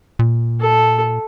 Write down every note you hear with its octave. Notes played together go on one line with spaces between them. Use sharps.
A#2
A4